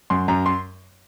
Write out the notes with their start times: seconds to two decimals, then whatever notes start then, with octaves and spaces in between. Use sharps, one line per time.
0.10 F#2 C6
0.28 F#2 A#5
0.46 C6